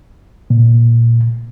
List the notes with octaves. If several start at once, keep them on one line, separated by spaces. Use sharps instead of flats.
A#2